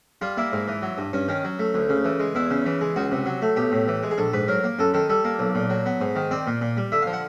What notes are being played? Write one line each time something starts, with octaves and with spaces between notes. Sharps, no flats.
G3 F4
A#3 E4
G#2
E3
F#3
G2
G2 C#4
D#3 C#4
F#3
A3
D2
C#3
E3
G#3
E2 E4
C#3
E3
G#3
C#2 F#4
C3
F#3
A3
B1 G4
A2
E3
G#3
G#4
A#1 A4
G#2 B4
F#3 A#4
A#3
F#2 A4
D#3 A4
G3 A4
A#3
B1
A#2
F#3
B3
G#2
D#3
C4 D5
A#2
A#2
G3
D3 E5
F5
F3
F#5